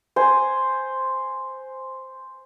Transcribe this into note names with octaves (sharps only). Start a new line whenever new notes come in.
C5 G#5